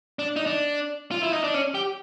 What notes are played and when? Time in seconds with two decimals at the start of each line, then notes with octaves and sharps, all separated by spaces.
0.19 D4
0.36 D#4
0.46 D4
1.11 F4
1.23 E4
1.33 D#4
1.44 D4
1.54 C#4
1.75 G4